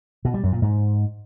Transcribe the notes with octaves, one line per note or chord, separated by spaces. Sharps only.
B2
G3
F#2
A#2
G#2